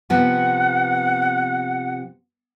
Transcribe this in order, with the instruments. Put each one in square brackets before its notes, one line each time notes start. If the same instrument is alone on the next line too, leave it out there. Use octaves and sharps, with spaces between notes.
[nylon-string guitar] C3 F3 B3 [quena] F#5